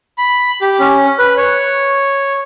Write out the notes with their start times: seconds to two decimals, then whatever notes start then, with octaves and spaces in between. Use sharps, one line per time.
0.18 B5
0.61 G4
0.79 C#4
1.19 B4
1.37 C#5